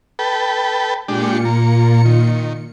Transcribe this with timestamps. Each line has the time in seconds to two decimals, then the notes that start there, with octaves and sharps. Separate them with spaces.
0.19 A4 B4 G5
1.08 A#2 G#3 D4 F4 G4 C#7
1.45 A#3
2.05 D#3